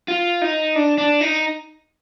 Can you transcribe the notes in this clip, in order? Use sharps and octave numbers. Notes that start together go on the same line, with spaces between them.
F4
D#4
D4
D4
D#4